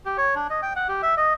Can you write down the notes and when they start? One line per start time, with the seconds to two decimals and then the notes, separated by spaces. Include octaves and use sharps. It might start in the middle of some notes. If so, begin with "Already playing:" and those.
0.05 G4
0.18 C#5
0.35 D4
0.50 D#5
0.62 G5
0.76 F#5
0.88 G4
1.03 E5
1.17 D#5